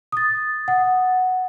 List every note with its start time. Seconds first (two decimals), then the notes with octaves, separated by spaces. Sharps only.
0.12 D#6 A6
0.68 F#5